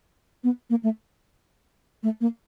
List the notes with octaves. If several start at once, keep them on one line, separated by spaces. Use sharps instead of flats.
B3
A#3
A3
A3
A#3